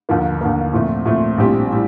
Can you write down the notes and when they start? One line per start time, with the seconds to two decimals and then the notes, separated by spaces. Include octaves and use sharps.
0.09 D#2 D3 F3 A#3
0.41 D#2 D3 F3 A#3
0.73 A#2 F3 A3 C4
1.06 A#2 F3 A3 C4
1.38 A#1 A2 G3 C4 G4
1.71 A2 G3